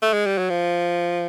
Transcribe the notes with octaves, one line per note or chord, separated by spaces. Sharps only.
A3
G#3
G3
F#3
F3